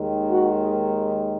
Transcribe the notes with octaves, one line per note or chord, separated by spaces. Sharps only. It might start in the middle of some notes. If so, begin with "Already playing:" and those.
Already playing: D#2 D#3 G#3
F#4